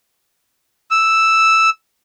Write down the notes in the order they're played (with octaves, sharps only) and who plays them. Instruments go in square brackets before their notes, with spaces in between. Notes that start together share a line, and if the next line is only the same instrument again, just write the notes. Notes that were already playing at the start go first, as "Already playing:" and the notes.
[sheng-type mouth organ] E6